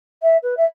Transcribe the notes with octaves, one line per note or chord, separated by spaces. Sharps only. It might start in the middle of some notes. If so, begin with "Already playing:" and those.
E5
B4
E5